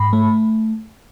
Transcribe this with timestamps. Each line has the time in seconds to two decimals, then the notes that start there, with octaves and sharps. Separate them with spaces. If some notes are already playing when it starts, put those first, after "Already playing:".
Already playing: G#2 B5
0.13 A3